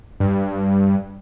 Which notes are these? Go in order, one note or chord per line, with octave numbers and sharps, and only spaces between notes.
G2